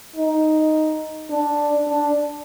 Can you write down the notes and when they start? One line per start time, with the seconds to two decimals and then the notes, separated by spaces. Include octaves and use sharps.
0.16 D#4
1.30 D4
1.88 D4